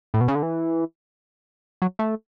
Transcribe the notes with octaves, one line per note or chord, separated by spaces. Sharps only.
A2
B2
C#3
D3
E3
F#3
A3